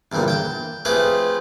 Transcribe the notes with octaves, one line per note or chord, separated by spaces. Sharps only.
E2 G2 A#2 D3 C4
G5 A5
F3 A3 C4 G4 G#4 B4